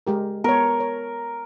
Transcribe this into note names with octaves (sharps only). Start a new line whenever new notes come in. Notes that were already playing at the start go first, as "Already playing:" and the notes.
G#3 G4 A#4
B3 A#4 C#5
C#5